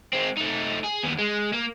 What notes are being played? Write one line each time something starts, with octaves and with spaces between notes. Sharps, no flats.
G#3 C4
A3 D#4
G#4
D#2 B3
G#3
A#3